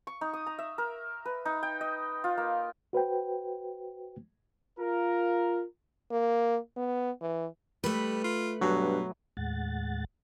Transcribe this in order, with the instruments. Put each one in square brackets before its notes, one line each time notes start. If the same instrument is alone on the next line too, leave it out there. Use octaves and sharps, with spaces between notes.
[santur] C#6
D#4
D#6
A#5
E5
A#4
B4
D#4
G5
D#5
F4
A#3
[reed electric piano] F#4 B4 C5 G5
[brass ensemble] F4 A#4
[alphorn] A#3
B3
E3
[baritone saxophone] G3 [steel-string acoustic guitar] A3 B4
[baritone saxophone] F4
[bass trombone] G2 [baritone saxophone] B2 [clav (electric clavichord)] F#3
[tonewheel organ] D#2 A2 G#3 F#5 A6